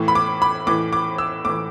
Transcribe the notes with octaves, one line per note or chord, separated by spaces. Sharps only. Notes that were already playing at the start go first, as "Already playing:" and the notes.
Already playing: A2 E3
B5
D6
B5
A2 E3 D6
D6
E6
A2 E3 D6